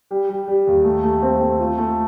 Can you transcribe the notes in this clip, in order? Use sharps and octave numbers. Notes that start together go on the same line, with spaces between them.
G3
G3
G3
D#2
A3
A3
C4
A3
F4
A3